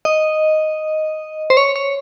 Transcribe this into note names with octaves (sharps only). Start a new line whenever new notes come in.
D#5
C5
C#5
C#5